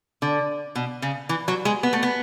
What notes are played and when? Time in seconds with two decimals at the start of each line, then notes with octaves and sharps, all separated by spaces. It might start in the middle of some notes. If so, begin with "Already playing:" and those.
0.22 D3
0.75 B2
1.02 C#3
1.29 E3
1.48 F#3
1.65 G#3
1.83 B3
1.93 A3
2.03 B3